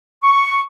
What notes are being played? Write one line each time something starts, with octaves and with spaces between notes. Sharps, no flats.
C#6